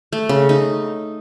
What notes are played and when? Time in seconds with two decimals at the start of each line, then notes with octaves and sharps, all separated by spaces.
0.13 A3
0.29 C#3
0.49 D#4